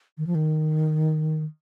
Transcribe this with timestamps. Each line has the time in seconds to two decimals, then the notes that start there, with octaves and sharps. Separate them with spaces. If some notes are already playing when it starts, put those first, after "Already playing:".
0.18 D#3
0.27 F3
0.35 D#3